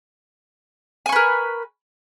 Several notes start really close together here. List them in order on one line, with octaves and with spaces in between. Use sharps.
G#5 C#6 B4 A#4